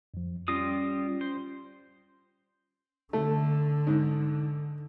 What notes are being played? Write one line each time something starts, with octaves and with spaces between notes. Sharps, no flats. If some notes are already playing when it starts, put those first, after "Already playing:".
F2 F3
G3 C#4 F4 D#6 A#6 C7
C5
D3 A3
G#2